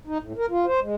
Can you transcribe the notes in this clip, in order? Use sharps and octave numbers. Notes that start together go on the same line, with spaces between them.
D#4
A2
A#4
F4
C5
G#3